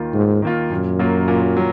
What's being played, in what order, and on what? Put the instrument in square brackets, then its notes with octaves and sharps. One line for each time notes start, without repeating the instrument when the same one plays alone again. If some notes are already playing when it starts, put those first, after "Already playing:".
Already playing: [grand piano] D#2 D#3 A#3 F4
[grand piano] D#2 [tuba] G#2
[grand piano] D#3 A#3 F4
[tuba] F#2 [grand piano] A#2
[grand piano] F#3 A#3 F4
A#2
F#3